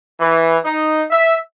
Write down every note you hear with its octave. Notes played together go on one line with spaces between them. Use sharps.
E3
D#4
E5